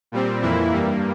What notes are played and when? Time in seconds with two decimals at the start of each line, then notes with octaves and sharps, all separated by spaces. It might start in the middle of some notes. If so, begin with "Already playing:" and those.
0.12 A#2 G3 C4
0.42 F2 E3 A#3 E4
0.72 G2 G3 A#3